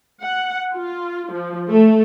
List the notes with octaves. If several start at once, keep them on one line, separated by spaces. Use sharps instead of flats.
F#5
F4
F3
A3